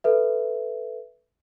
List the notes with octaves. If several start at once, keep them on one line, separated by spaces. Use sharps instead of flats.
A4 B4 E5